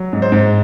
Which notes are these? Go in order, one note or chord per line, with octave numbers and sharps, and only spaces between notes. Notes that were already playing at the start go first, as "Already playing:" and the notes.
Already playing: F#3
G#2
C5
G#2